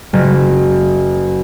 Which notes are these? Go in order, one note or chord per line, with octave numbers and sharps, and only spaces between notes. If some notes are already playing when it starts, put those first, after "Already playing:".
F#1